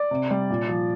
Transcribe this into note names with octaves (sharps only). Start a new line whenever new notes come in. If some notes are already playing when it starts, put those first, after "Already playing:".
Already playing: D5
C3
G3
A#2
F3